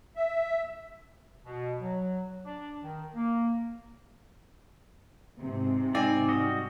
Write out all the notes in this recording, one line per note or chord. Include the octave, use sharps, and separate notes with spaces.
E5
B2
F#3
D4
D#3
A#3
G#2 C3
C4 D#4 D5 G#5
G3 F#4 D#5